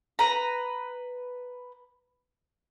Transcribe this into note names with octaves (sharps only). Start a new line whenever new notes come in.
B4 A#5